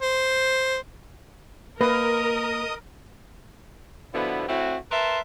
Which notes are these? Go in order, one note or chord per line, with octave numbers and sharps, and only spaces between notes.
C5
A#3 A#4 B4 D#5 D#6
B2 D3 F3 B3 E4
A2 C4 E4 F#4
A#4 B4 E5 A5 C6